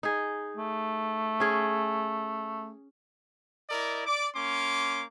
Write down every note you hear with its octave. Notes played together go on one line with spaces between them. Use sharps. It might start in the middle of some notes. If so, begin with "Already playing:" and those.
D#4 G#4
A3
C#4 G#4
E4 A#4 D5 D#5
D5 D6
A#3 C#4 C6 D6